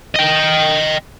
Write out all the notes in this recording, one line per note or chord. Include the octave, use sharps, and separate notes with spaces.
D#5 G5